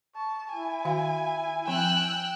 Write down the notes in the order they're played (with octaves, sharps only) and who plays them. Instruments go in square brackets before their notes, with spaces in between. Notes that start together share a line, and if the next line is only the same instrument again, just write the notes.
[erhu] A5 [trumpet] C#6
[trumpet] E4 [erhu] G#5
[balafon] D#3 F#4 F5
[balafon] F3 C4 [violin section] G5 E6 F#6